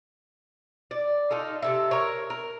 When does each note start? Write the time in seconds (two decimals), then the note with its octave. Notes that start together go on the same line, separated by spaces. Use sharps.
0.91 D5
1.31 D#4 F4 A4
1.62 C3 A4 E5
1.91 A#4 C#5
2.30 A#4